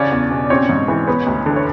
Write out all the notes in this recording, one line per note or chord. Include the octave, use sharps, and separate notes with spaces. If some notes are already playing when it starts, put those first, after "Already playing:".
Already playing: C#3 C#4 D4 D5
E2
B2
C4 C#4 C#5
G#2
E3
B3
D2
D3
C#5